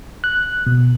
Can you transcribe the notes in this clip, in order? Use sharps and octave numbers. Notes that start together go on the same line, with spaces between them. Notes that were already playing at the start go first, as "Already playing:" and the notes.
F#6
B2